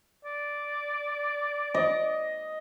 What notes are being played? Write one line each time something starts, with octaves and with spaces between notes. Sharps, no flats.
D5
D#5